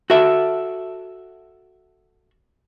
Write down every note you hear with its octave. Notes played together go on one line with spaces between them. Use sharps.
F#4 A4 E5